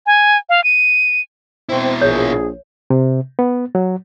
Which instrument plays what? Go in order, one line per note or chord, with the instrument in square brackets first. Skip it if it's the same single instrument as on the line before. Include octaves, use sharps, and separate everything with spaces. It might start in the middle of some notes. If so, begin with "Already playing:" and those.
[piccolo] G#5
F5
D#7
[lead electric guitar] B2 E4 [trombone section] C4
[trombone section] A#1 [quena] G#4 [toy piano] C#5
[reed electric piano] C3
B3
F#3